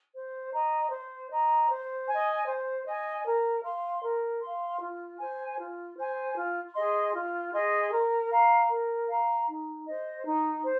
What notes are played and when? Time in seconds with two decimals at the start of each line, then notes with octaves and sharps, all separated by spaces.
0.13 C5
0.52 D#5 A#5
0.91 C5
1.29 D#5 A#5
1.69 C5
2.07 G#5
2.12 D#5
2.46 C5
2.85 D#5 G#5
3.24 A#4
3.63 F5 C6
4.02 A#4
4.41 F5 C6
4.80 F4
5.18 C5 G#5
5.57 F4
5.97 C5 G#5
6.35 F4
6.74 G#4 D#5 C6
7.13 F4
7.52 G#4 D#5 C6
7.91 A#4
8.30 F5 A#5
8.69 A#4
9.08 F5 A#5
9.47 D#4
9.86 C5 D#5
10.25 D#4
10.63 C5